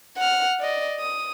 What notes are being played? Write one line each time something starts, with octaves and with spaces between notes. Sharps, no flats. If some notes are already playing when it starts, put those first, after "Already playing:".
F#5 F6
D5 D#5
D#6